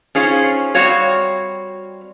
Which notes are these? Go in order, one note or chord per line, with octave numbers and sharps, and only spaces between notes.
C#4 D#4 F4 G#4 C5 C#5
G3 C4 F#4 C#5 F5